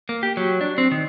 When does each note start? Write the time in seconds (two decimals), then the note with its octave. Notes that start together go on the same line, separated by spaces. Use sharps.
0.09 A#3
0.23 G4
0.37 F#3
0.61 D4
0.78 C4
0.92 D#3